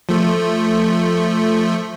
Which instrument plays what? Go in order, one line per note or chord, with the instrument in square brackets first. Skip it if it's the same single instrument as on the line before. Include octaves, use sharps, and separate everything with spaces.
[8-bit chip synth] F3 A3